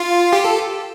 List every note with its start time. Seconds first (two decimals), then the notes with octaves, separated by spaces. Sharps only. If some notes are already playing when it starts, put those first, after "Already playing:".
Already playing: F4
0.33 G4
0.45 A4